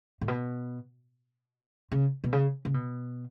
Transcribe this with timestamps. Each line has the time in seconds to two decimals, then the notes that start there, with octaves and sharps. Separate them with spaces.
0.21 A2
0.28 B2
1.92 C#3
2.24 B2
2.33 C#3
2.65 C#3
2.74 B2